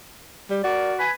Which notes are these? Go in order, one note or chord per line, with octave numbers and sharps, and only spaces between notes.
G3
F#4 A#4 D5
B4 G#5